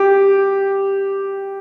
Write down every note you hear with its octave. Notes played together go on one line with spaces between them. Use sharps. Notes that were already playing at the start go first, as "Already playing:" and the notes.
Already playing: G4